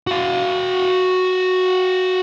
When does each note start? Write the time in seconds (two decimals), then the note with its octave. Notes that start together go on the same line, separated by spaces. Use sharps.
0.07 F#4 F5